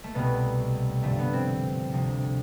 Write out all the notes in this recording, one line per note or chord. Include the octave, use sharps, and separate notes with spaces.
A3
C2 B2 B3
G2 D3 F3 A3
B3
C4
D2 C3 F3